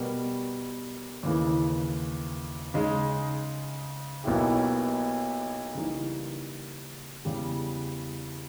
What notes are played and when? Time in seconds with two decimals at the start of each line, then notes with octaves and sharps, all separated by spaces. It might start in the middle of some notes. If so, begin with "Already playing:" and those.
Already playing: B2 G3 B3 G4 A#4
1.23 D#2 C#3 E3
2.74 C#3 G#3 D#4
4.24 B1 B2 A#3 E4 G4
5.75 C#3 E3 G3 A#3 D#4
7.25 E2 C#3 G3